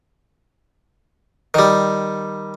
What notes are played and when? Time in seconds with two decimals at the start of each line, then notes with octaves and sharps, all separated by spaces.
1.54 D#3 G3